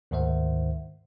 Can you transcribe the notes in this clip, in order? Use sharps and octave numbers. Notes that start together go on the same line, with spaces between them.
D2 G#2 D#3 C5 E5 F#5